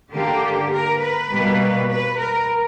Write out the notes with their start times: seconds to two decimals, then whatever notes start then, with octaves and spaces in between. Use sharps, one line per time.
0.13 D3 A#3 G4
0.73 A#4
1.01 B4
1.31 B2 G3 A#3
1.90 B4
2.19 A#4